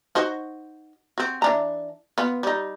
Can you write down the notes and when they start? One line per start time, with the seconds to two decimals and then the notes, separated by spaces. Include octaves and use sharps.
0.15 D#4 F#4 C5
1.18 C4 F#4
1.42 E3 D4 A#5
2.18 B3 F4
2.43 G3 D#4